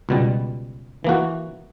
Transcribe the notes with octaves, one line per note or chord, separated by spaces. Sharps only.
C#2 B2 G3
E3 A#3 F#4